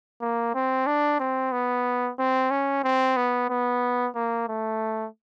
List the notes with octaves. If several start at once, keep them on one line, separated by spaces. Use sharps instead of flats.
A#3
C4
D4
C4
B3
C4
C#4
C4
B3
B3
A#3
A3